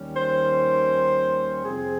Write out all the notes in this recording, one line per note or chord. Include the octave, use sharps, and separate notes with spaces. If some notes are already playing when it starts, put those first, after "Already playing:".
Already playing: D#2 D#3 G3 C#4
C5
F2 C3 F3 C4 G#4